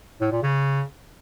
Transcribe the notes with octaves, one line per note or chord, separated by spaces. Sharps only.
A2
A#2
C#3